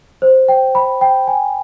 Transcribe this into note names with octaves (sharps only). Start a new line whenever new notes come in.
C5
G5
B5
G5
G#5